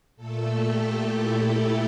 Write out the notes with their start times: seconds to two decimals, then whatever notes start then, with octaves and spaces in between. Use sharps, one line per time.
0.16 A#2 A3 A4
0.63 G4
1.09 E4
1.56 E4